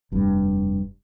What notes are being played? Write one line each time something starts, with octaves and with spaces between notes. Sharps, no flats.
F1 G2